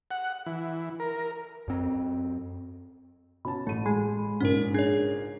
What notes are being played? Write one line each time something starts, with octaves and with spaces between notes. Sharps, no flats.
F#5
E3
A#4
F#2 C4
B2 C#4 A5 B5
A1 A3 D#7
G#3 B5
A#1 G#2 C#3 C#4 A#4
D4 G#4 C#5